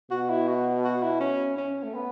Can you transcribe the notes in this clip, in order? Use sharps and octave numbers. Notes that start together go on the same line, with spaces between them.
B2 F#4
E4
F#4
F#4
E4
C#4
C#4
A3
B3